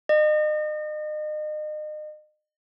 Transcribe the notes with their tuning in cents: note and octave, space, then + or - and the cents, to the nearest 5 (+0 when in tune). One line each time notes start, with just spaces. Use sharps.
D#5 -35